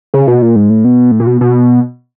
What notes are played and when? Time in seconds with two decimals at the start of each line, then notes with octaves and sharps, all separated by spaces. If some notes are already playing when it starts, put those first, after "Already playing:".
0.14 C#3
0.28 B2
0.42 A#2
0.56 G#2
0.70 A2
0.85 B2
1.11 A2
1.20 A#2
1.27 B2
1.41 B2